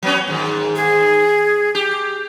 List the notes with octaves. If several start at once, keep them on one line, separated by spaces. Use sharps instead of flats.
F#3 B3 C#4
G#2 D#3
G#4
G4